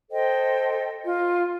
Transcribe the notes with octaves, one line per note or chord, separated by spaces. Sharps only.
A4 C5 D#5 G5
F4